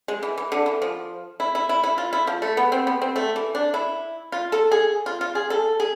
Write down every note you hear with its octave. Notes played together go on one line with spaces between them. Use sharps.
G#3
E3
E3
D3
E3
F3
E4
E4
E4
E4
F4
E4
F3
A3
B3
C4
B3
C4
A3
E3
D4
E4
F4
A4
G#4
F4
F4
G#4
A4
G#4